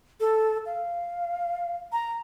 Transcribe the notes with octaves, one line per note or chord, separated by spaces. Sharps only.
A4
F5
A#5